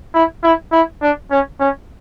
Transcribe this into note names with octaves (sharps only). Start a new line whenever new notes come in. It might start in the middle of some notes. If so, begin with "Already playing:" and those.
E4
E4
E4
D4
C#4
C#4